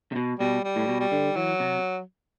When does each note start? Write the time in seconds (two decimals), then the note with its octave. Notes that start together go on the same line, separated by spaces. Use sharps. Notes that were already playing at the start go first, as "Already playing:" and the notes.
0.12 C3
0.16 B2
0.40 B2 G3
0.64 G3
0.76 A2
0.88 B2
1.00 G3
1.12 D3
1.36 E3 F#3
1.60 C3